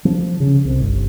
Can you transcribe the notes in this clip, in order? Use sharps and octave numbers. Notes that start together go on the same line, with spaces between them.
F3
C#3
C2
G1